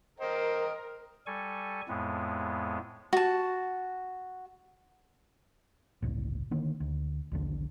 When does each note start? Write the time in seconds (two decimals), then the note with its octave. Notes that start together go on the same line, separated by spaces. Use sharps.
0.20 A#4 C5 D#5 G5
1.27 G3 A4 G#5 C#6
1.88 F2 A2 G#3 B3
3.13 F#4 A5
6.02 G1 C#2 A2
6.51 D3 D#3 A#3
6.80 D2
7.32 A#1 D#2 D3